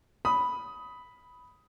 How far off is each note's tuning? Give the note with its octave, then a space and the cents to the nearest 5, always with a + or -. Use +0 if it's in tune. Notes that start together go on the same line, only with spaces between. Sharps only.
B5 +0 D#6 +15